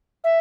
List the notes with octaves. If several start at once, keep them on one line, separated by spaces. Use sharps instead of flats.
E5